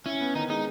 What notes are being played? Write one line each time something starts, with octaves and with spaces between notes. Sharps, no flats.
C#4 E4
B3
D#3 D#4
G#3 D#4